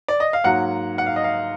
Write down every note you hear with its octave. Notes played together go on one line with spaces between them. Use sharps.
D5
D#5
F5
G#2 F#3 A#3 F#5
F#5
F5
D#5
F5